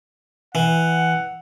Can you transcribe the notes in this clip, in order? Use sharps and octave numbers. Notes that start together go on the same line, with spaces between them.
E3 F#5